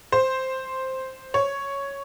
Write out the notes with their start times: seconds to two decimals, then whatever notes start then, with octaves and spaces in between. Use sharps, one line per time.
0.12 C5
1.34 C#5